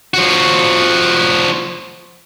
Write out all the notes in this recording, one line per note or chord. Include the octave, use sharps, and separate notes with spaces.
F3 F#4